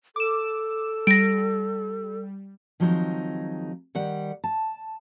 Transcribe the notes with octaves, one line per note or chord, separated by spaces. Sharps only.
A4 D6 E7
G3 A#6 D7
D#3 F3 F#3 G#3 C4 D#4
D#3 G3 F#5
A5